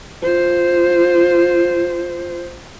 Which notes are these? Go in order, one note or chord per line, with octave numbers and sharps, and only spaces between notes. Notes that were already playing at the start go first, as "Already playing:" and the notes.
F4 C5